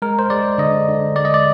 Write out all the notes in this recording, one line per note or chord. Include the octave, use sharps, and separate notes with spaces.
G#3 A#4
C5
G#3 D5
D3 D#5
D3
G#3 D5
D#5
D5